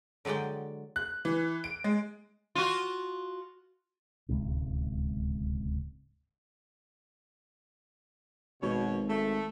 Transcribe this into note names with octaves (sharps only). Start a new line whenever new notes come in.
D3 F#3 G#3 D5 G5
F#6
E3
D7
G#3
F4 F#4
D1 C#2 G#2 C3
G#1 B2 C#5
A3